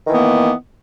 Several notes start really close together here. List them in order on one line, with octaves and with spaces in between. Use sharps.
D#3 E3 B3 A#3